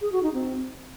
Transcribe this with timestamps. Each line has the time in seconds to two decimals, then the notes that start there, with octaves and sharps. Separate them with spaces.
0.01 G#4
0.12 F#4
0.23 D#4
0.34 C4